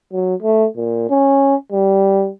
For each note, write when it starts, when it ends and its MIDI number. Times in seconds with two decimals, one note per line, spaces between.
0.13 0.35 54
0.42 0.66 57
0.77 1.08 46
1.10 1.55 61
1.72 2.30 55